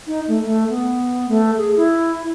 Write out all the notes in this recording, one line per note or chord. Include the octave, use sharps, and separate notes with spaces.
D#4
A3
A3
B3
A3
G#4
E4